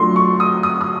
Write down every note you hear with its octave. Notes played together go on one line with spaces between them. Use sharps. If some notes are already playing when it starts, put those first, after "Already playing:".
Already playing: F#3 A3 D4 F4 C6
C#6
D#6
D#6
D#6